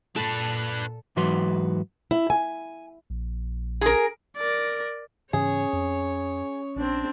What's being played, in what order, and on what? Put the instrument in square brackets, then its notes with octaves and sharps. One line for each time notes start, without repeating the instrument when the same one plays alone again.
[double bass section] A#2 [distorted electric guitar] D4 B4 [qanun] A4
[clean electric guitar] G#2 E3 F#3 F#4 B4 C6
[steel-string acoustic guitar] E4
G#5
[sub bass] A#1
[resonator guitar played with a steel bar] G#4 A#4
[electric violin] A#4 D5
[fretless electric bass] G#2 C#3 E3 [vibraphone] C#4 [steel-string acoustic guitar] G#4 [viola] C#5
[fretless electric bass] F2
[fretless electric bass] A#1 [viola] C4 D4